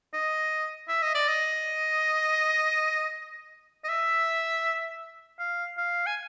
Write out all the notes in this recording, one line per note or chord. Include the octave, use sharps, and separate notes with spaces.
D#5
E5
D#5
D5
D#5
D#5
E5
F5
F5
G#5